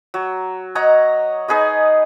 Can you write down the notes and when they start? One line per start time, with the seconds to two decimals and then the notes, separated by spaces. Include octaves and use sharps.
0.14 F#3
0.75 C#5 D#5 F#5 A#5
1.48 D#4 G#4 B4 D#5